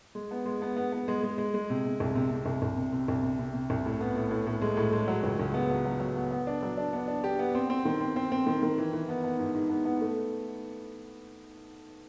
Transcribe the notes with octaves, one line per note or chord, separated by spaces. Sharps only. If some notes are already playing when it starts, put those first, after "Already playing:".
G#3
B3
G#3
B3
B3
B3
G#3
G#3
G#3
G#3
C3
C3
C2
C3
C3
C2
C2
C3
C3
C2
C3
C3
C3
C2
A2
B3
A2
A2
A2
G#3
A2
G#3
F#3
C#2
C#2
B3
F#3
F#3
F#3
B3
B3
D4
F#3
D4
B3
D4
G4
B3
C4
C4
D#3
C4
C4
C4
D#3
D#3
E3
E3
B3
B3
G#2
G#2
B3
B3
A3